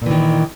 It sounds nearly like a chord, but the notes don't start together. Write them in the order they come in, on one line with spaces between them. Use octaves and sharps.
A#2 E3 D#3